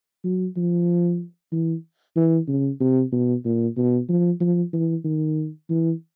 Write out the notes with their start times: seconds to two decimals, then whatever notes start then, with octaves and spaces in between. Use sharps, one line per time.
0.24 F#3
0.56 F3
1.52 E3
2.16 E3
2.48 C#3
2.80 C3
3.12 B2
3.45 A#2
3.77 B2
4.09 F3
4.40 F3
4.73 E3
5.04 D#3
5.69 E3